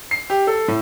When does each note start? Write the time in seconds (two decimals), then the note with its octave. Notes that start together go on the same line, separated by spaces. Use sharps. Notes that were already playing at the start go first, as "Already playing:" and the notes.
0.11 C7
0.30 G4
0.47 A4
0.68 A2